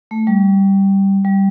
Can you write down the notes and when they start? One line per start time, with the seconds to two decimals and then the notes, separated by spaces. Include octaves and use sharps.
0.11 A3
0.27 G3
1.25 G3